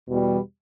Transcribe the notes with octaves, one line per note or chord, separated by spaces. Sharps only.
E2 B2 G3